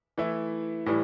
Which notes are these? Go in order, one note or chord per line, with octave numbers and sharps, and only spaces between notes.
E3 A3 E4
A2 E3 G3